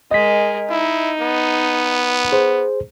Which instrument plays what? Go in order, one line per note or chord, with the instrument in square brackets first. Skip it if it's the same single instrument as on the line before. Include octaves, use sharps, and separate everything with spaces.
[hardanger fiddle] G#3 A#4 [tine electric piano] D#5 B6
[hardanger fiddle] D#4 [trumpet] E4
[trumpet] B3
[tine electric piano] G#4 C5